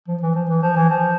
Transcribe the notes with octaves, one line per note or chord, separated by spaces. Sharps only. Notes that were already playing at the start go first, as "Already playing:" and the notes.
F3
E3
F3
E3
F3
E3
F3